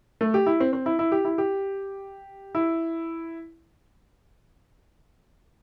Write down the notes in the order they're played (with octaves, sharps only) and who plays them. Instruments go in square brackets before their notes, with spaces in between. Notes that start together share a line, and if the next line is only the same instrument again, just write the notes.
[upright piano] A3
G4
E4
C4
C4
E4
E4
G4
E4
G4
E4